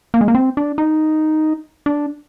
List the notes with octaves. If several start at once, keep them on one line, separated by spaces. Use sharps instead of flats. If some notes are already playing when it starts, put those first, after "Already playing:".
A#3
G#3
A#3
C4
D4
D#4
D4